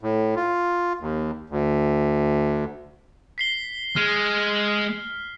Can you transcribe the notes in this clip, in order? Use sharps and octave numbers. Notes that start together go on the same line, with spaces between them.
A2
F4
D#2
D2
B6 C7 G7
G#3 F6